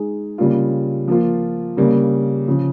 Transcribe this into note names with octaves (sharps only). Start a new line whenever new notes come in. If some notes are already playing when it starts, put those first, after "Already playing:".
Already playing: G#3 D#4 G#4
C#3 G3 A#3 F4
F3 A#3 F4
C#3 G3 A#3
C#3 F3